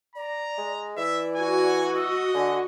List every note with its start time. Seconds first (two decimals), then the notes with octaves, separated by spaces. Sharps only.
0.15 D5 A#5
0.58 G#3
0.97 E3 D5 E5
1.36 F#4 G#5
1.95 D#5 E6
2.34 D3 G#5